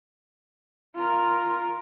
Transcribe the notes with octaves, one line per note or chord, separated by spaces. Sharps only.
F4 A#4